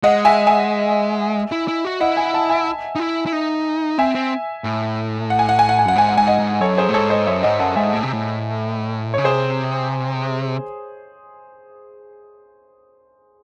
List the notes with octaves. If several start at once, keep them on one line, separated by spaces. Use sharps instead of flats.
G#3 D#5 F#5
E5 G#5
E5 G#5
E4
E4
F#4
E4 D#5 F#5
E5 G#5
F#5 A5
E5 G#5
D#4
E4
E4
D#4
C4 E5 G#5
C4
A2
F#5
G#5
F#5
G#5
F#5
G#5
F#2 F#5
G#2 G#5
F#5
G#2 G#5
D#5 F#5
G#2
F#2 A4 C#5
G#4 C5
A2
G#2 A4 C#5
C5 D#5
F#2 C#5 E5
G#2 D#5 F#5
F#2 F#5 A5
G#2 E5 G#5
A2
C3
A2
C#3 C#5
C3 G#4 C5